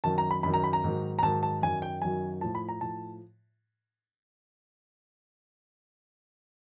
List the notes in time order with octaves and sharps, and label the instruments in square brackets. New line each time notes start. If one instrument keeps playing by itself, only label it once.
[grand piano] F#2 D#3 F#3 A5
A#5
B5
F#2 D#3 F#3 B5
A#5
B5
A#5
G#2 D#3 F#3
A#5
G#2 D#3 F#3 A5
A5
F#2 D#3 F#3 G#5
G5
F#2 D#3 F#3 G#5
A2 F3 A5
B5
A#5
A2 F3 A5